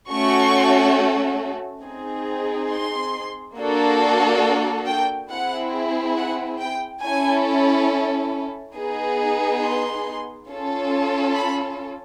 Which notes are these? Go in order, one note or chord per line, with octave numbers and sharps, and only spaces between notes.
A3 C#4 F#4 A4 C#6
C4 D#4 G#4
C6
A#3 D4 F#4 A4
G5
C4 E4 G#4 F#5
F#5
G5
C#4 E4 A4 G#5
B3 D#4 G#4
C6
C#4 F4 A4
B5